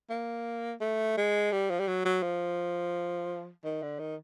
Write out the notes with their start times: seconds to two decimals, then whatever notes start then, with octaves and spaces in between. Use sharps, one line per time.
0.10 A#3
0.81 A3
1.17 G#3
1.52 G3
1.70 F3
1.80 G3
1.88 F#3
2.05 F#3
2.22 F3
3.64 D#3
3.82 D3
3.99 D#3